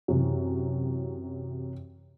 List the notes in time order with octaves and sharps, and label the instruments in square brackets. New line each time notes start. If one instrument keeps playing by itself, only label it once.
[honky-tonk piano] F#2 C3 E3